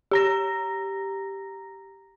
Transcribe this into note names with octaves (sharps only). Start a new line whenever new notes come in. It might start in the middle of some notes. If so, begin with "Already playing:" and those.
G4 A#5 A#6